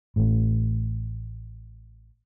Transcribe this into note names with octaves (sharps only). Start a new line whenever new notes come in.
A1 A2